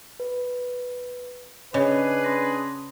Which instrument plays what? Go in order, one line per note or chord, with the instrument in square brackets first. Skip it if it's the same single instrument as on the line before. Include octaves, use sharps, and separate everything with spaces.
[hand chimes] B4
[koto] C#3 [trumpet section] D4 G#4 B4 [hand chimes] D#5
[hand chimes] C#4 C6 A#6